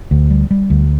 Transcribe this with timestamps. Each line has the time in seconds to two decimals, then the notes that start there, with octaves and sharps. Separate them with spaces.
0.11 D2
0.31 G3
0.51 G3
0.70 D2